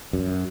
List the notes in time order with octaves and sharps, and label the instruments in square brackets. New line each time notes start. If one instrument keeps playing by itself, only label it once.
[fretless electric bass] F#2